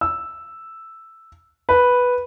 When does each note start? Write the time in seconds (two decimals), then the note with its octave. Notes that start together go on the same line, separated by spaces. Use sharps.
0.01 E6
1.69 B4